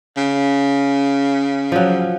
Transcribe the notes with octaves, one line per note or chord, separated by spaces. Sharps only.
C#3
F3 F#3